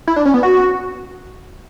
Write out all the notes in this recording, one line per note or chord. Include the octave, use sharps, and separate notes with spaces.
E4
D4
C#4
B3
F#4